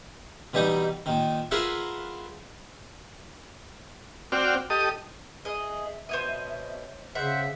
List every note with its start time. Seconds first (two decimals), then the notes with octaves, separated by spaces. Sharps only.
0.54 B2 E3 G3 D#4
1.06 A#2 D#3
1.51 F4 G#4 A#4 B4 E5 F#5
4.32 C4 F#4 D5 G5 F6
4.70 G4 A4 D#5 D#6
5.45 G#4 D#5 E5
6.09 B2 C5 C#5 D#5
7.15 C#3 G#4 C5 E5 F#5